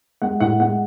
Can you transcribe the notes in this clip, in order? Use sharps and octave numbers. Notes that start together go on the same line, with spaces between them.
G#3 F#5
A2 F#5
G#3 F#5